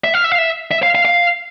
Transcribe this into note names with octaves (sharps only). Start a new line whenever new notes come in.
E5
F5
E5
F5
E5
E5
F5
F5
F5